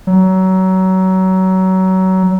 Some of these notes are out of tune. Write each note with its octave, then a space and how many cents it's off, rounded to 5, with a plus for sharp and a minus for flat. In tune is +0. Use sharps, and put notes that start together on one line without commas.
F#3 +25